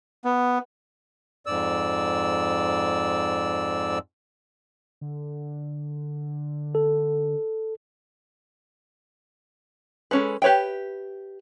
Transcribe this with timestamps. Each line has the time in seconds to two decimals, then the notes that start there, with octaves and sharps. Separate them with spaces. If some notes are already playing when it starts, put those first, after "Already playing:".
0.25 B3
1.46 F2 G#2 D5 E6
5.01 D3
6.75 A4
10.11 G#3 A3 C#4 A4 B4
10.42 G4 B4 C#5 E5 G5